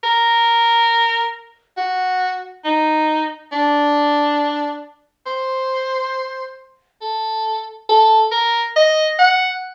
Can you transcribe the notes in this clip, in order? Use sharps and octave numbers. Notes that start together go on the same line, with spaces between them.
A#4
F#4
D#4
D4
C5
A4
A4
A#4
D#5
F#5